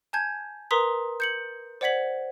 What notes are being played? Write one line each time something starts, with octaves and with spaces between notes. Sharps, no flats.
G#5 A5 G6 G#6
A#4 B4 A#5 C6 D#6 B6
G6 C#7 F#7
C5 D5 F#5 G#6 B6 F#7